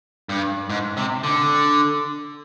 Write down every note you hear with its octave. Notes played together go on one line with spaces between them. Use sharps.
G2
G#2
C3
D3